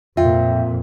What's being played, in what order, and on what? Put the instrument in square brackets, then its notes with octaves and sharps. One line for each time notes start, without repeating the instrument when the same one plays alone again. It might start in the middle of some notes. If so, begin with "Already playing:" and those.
[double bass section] F2 A#2 [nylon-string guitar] F4 [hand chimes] E5 G5